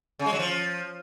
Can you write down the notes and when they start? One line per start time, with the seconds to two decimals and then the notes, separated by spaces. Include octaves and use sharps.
0.19 C#3
0.26 G#3
0.33 F#3
0.39 F3